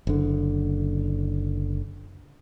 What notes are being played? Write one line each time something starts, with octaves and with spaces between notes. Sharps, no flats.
F#1 D3